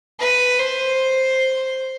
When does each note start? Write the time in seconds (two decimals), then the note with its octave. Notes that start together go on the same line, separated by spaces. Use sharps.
0.20 B4
0.59 C5